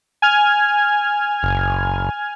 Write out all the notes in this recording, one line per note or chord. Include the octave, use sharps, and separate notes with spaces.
G#5 F6 G#6
F#1